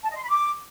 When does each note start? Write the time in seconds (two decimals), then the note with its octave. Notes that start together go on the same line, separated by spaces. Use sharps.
0.04 A5
0.10 D#5
0.16 C6
0.23 B5
0.29 D6